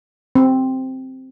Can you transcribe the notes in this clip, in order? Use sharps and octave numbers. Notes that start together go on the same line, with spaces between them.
C4